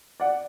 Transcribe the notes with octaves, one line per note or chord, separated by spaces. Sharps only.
D5 F#5